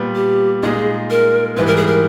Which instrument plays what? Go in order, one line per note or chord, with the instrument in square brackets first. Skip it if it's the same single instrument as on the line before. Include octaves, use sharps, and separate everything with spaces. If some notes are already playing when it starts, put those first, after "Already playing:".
Already playing: [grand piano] A#2 G3 B3
[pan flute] G4
[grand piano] A#2 G#3 D#4 [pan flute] G#4
[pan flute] A#4
[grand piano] G#2 E3 G3 [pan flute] B4
[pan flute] A#4
G#4
A#4